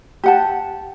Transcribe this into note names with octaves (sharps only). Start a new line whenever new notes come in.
G4 F#5 A5